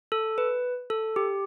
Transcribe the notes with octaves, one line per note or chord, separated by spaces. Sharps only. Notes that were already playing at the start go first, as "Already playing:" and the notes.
A4
B4
A4
G4